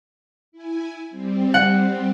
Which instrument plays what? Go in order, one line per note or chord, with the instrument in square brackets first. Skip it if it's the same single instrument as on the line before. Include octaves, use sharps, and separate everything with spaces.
[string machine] E4 G#5
G3 C4
[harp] F#5